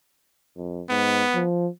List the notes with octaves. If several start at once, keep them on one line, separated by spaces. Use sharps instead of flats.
F2
G#2 B3
F3